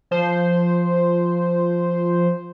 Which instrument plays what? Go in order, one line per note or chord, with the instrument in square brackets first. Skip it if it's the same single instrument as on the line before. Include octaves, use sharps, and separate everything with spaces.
[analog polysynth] F3 C5